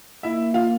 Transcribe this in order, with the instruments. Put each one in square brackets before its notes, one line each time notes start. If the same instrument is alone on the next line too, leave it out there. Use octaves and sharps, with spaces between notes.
[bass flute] A#3 [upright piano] E4 E5
[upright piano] F4 F5